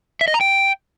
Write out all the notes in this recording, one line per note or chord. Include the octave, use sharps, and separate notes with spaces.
E5
D#5
A#5
G5